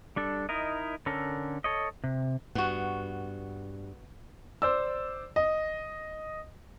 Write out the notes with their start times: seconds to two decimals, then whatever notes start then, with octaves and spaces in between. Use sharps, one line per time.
0.16 G3 D4 A4
0.49 D#4 E4 A#4 D#5
1.06 D3 C#4 A4 A#4
1.64 A4 C#5 D#5
2.04 C3
2.55 G2 B3 F#4
4.62 C5 D5 E6
5.36 D#5